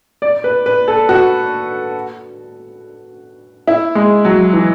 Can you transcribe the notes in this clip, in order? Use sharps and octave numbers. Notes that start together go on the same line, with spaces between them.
D5
B4
B4
A4
F#4
E4
G#3
F#3
E3